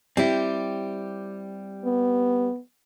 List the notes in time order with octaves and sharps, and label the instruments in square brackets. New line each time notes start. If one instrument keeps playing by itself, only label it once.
[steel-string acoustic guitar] G3 G4 [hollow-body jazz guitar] C4 E4
[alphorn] B3